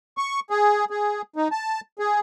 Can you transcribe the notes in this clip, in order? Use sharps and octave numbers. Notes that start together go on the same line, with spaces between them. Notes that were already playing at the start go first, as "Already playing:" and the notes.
C#6
G#4
G#4
D#4
A5
G#4